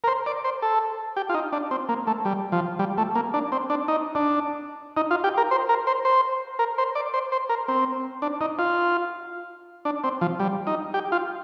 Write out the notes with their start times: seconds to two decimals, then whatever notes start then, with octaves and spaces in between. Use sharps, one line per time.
0.04 A#4
0.07 C5
0.26 D5
0.44 C5
0.62 A4
1.16 G4
1.29 F4
1.34 D#4
1.53 D4
1.71 C4
1.89 A#3
2.07 A3
2.25 G3
2.52 F3
2.79 G3
2.98 A3
3.15 A#3
3.34 D4
3.52 C4
3.70 D4
3.88 D#4
4.15 D4
4.97 D#4
5.11 F4
5.24 G4
5.38 A#4
5.51 C5
5.69 A#4
5.87 C5
6.05 C5
6.59 A#4
6.78 C5
6.95 D5
7.14 C5
7.32 C5
7.49 A#4
7.68 C4
8.22 D4
8.41 D#4
8.59 F4
9.85 D4
10.04 C4
10.21 F3
10.40 G3
10.67 D#4
10.94 G4
11.12 F4